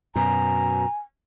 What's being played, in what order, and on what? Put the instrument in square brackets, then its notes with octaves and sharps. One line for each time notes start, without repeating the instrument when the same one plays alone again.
[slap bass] F#2 B2 [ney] G#5 [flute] A#5